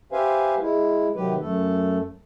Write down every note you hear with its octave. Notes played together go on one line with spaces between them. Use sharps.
G4 B4 C5 E5 F5 G#5
G#3 E4
C3 D#3 F#3 G4 B4
F#2 A3 A4